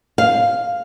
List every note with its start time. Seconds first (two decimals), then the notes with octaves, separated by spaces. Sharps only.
0.18 F5